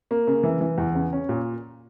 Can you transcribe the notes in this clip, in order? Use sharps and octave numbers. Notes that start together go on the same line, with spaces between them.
A#3
C#3
E3
E3
E2
C#3
C#4
A#2